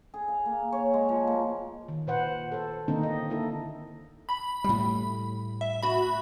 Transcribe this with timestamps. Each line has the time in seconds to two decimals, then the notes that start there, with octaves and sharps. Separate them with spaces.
0.14 G#4
0.28 F5
0.46 A#3
0.72 C#5
0.94 G#3
1.09 F3
1.27 A#3
1.88 D#3
2.07 A#2 B4 C5 F#5
2.52 A4 C5
2.88 D3 D#3 A#3 C4 D4 D#4
3.03 D#5
3.30 A#3 D#4 E4 A4
4.29 B5
4.64 A2 G3
5.61 E5
5.83 F#4 B5